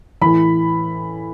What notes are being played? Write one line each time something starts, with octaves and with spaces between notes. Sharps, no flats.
A2 E3 B5